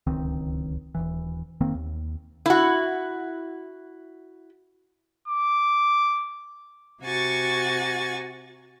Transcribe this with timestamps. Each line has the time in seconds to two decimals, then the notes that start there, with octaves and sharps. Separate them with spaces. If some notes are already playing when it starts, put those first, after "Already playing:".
0.07 D1 C#2 D#3 C4
0.95 D#1 A#1 E3
1.61 F1 D#3 A#3 C4
1.75 D#2
2.46 E4 F#4
5.28 D6
7.02 C3 F#4 G#5 C#6 A6